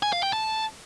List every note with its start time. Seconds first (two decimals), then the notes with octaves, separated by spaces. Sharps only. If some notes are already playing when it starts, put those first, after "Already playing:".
0.03 G#5
0.13 F5
0.23 G5
0.33 A5